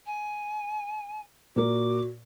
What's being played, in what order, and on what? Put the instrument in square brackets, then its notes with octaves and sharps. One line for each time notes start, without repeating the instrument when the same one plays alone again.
[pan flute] G#5
[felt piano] A#2 A#3 A#4 [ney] F#4 [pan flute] D6